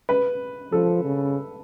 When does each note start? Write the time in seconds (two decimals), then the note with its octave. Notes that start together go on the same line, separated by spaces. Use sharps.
0.09 B4
0.72 F3 A4
1.04 C#3